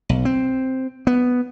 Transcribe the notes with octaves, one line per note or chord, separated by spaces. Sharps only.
B1
C4
B3